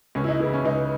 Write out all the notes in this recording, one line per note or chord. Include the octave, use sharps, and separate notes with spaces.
C#2 C#4
E4
D#4
C#3 E3 E4
C#4
C#2 D#4